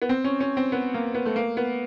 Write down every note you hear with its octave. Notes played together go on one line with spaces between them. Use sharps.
B3
C4
C#4
C#4
C4
B3
A#3
B3
A3
A#3
B3